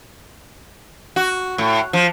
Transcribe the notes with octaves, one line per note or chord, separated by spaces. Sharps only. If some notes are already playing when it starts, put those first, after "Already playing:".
F#4
A2
F3